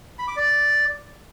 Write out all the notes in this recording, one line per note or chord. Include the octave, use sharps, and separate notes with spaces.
B5
D6
D5